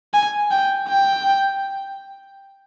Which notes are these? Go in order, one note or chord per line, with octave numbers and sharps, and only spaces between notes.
G#5
G5
G5